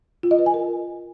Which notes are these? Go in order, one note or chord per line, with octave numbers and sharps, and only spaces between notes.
F4
D#5
B4
G#5
A#4